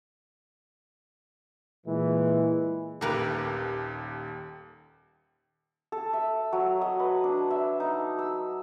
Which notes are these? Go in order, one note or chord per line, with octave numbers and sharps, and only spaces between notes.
A#2 E3 G#3
D#1 D#2 G4 A#4 B4
A4
E5
F#3
D#5
B4
D4
E5
D#4
E6